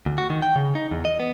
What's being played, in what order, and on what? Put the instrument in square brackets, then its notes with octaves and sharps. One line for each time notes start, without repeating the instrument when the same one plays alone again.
[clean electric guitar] D2
F#4
D#3
G5
C#3
D#4
E2
D#5
B3